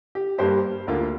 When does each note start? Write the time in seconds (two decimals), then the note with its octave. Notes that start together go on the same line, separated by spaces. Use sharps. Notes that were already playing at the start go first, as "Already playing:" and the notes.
0.15 G4
0.38 G2 G3 A#3 G4 C5
0.87 D2 D3 A#3 F4 A#4